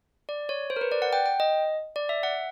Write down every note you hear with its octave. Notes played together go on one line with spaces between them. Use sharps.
D5
C#5
C5
A#4
B4
D5
F#5
G5
G5
D#5
D5
E5
F#5